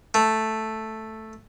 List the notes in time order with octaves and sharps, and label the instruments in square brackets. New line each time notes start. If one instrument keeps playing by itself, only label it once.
[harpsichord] A3